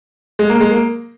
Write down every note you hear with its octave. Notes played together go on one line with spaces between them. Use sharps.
G#3
A#3
G#3
A#3